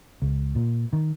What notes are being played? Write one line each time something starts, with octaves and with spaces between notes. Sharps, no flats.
C#2
A#2
D#3